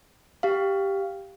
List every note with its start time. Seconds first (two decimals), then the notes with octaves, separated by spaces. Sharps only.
0.43 G4 F5